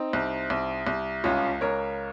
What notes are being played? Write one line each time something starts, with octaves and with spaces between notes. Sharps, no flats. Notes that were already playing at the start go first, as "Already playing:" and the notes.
Already playing: C4 D#4
C2
C2
C2
C#2 C#4 F4
C#2 A#4 C#5